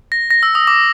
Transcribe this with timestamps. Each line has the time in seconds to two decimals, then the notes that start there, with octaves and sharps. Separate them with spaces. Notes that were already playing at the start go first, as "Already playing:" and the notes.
0.12 A#6
0.30 A#6
0.43 E6
0.55 D#6
0.67 D6